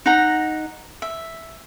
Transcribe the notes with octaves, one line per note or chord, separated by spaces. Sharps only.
D#4 F#5 A#5
E5